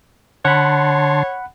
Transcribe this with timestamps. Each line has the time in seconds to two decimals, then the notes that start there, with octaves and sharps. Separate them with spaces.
0.45 D3 C#5 F#5 A5 B5 C6